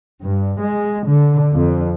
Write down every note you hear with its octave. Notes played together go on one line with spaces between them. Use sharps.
G2
G#3
D3
F2